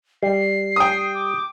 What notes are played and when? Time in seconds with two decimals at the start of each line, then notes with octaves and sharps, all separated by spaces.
0.23 G3 C7
0.76 G5 D#6
1.15 D6